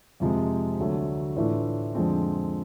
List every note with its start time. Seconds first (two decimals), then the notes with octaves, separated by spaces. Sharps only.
0.20 F2 C3 F3 G#3
0.77 D2 D3 F#3 A3
1.36 A2 E3 A3 D4 F4
1.95 F2 D3 F3 G#3 C4